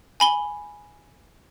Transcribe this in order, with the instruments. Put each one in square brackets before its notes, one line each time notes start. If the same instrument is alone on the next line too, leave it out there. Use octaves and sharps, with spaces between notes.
[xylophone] G#5 B5 G7